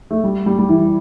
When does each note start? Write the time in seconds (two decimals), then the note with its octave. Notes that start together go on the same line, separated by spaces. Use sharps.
0.11 A3
0.24 G3
0.46 G3
0.59 G3
0.69 E3